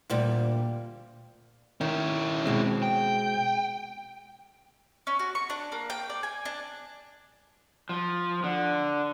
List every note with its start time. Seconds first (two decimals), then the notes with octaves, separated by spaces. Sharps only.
0.10 D2 A#2 G3
1.81 D#3 C#4 E4
2.45 B2 G#3 C4
2.83 G5
5.07 C#4
5.19 F#4
5.35 C#6
5.50 D4
5.72 A#3
5.90 G5
6.10 D5
6.23 G#5
6.45 D4
7.89 F3
8.44 D3